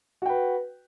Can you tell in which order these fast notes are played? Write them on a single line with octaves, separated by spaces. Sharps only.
F#4 G5 B4